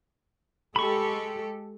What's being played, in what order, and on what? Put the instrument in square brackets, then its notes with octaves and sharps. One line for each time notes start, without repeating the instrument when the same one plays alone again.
[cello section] G#3 G4 A4 [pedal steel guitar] B5 C#6